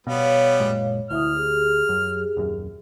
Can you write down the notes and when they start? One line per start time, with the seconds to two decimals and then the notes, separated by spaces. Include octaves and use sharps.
0.07 B2 G3 B3 C#5 F5
0.59 F#1 A#2 G#3
1.10 D2 E4 E5 D#6 F6
1.35 G4 G#4
1.89 F#2
2.37 D#1 F#2